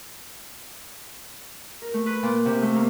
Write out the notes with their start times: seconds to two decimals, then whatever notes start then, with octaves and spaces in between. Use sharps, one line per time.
1.82 A#4
1.94 A3
2.06 B4
2.23 A#2
2.45 C3
2.62 A3
2.75 A#3